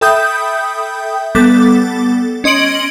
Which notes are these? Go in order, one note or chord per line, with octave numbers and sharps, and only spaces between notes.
A4 E5 G5 B5 D#6 G6
G3 B3 A4 D6 A6
C#4 D#5 C6 D7 F#7